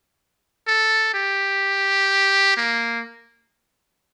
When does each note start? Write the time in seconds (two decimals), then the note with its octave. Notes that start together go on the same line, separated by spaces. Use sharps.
0.67 A4
1.14 G4
2.57 A#3